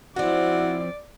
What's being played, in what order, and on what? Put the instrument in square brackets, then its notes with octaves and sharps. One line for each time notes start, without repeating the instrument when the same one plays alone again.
[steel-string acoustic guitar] F3 C4 [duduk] E4 [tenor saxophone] F#4 [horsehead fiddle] D5